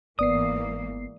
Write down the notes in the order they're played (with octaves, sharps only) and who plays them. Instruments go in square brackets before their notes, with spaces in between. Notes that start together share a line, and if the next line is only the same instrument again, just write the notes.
[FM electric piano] G1 B3 C7 [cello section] G#2 E3 A#3 [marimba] D5 [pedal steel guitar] D#6